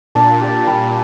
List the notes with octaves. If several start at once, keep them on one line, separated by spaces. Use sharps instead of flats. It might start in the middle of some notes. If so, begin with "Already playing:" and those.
A#2 D4
G4 D5
G3